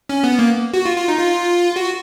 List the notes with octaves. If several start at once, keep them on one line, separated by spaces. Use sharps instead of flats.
C#4
B3
A#3
F#4
F4
F4
D#4
F4
F#4